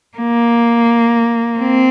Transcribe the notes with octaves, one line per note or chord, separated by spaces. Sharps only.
A#3
C4